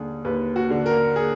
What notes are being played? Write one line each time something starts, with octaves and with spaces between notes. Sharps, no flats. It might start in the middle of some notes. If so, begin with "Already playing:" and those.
Already playing: D#2 D3 G#4
D#2 B4
F#4
D3
A#4
G#4